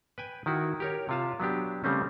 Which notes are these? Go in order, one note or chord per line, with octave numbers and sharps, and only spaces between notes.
B4 G5 G#5
D#3 E4 F#4
G4 A#4 C#5
C3 F4 A5
F#3 B3 D4 G4
C#3 G3 A3 C4 C#4